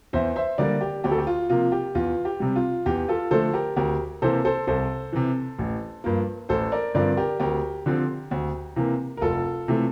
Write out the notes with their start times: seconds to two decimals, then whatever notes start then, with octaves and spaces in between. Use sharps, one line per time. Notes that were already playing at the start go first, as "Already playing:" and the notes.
0.13 E2 C5 E5
0.36 C5 E5
0.58 D3 G3 A#3 A#4 D5
0.81 G4
1.04 D2 G4
1.11 A4
1.18 G4
1.27 F4
1.49 C3 F3 A#3 F4
1.72 G4
1.95 E2 F4
2.25 G4
2.40 C3 G3
2.56 F4
2.86 E2 G4
3.08 F4 A4
3.31 D3 F3 A3 A4 C5
3.54 G4 A#4
3.77 D2 G4 A#4
4.22 C3 E3 A#3 A4 C5
4.45 A4 C5
4.67 C2 A4 C5
5.12 C3 E3
5.59 A1
6.04 G2 F3 A#3
6.49 A1 A4 C5
6.72 A#4 D5
6.94 G2 D3 F3 C4 A#4 D5
7.17 G4 A#4
7.40 D2 G4 A#4
7.86 D3 F3 C4
8.31 D2
8.76 C3 E3 A#3
9.17 A#4
9.21 F1 F4 A4
9.68 C3 E3 A3